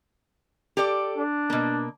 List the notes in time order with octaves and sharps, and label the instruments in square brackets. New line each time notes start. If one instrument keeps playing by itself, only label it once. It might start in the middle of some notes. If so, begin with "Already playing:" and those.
[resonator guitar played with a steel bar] G4 A4 D5
[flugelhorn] D4
[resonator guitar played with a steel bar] B2 A#3